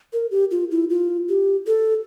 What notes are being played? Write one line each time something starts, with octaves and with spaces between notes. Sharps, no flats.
A#4
G4
F4
E4
F4
G4
A4